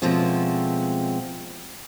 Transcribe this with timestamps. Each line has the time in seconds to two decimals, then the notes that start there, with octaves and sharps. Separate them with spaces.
0.02 B2 F3 G#3 A3 C4 C#4